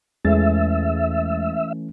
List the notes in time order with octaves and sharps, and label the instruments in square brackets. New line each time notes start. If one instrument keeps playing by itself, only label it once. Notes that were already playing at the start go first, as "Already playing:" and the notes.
[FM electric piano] E2 G#3 A6 [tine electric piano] E3 A3 C#4 [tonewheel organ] E5